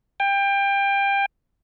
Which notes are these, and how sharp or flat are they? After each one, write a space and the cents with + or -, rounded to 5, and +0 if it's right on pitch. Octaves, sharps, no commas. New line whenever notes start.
G5 +25